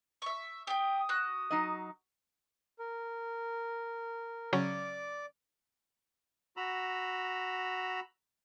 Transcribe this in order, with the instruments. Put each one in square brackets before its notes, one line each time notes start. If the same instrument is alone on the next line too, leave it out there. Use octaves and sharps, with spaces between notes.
[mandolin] E5 C#6
[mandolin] G4 G5 [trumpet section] D#6
[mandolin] F#4 F#6
[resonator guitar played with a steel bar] F#3 D#4 D#5
[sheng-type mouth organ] A#4
[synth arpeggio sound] C#3 F#3 C#4 [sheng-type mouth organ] D5 D6
[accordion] F#4 A#5 B5 E6